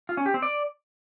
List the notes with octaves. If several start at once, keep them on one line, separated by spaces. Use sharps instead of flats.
F4
C#4
G4
C4
D5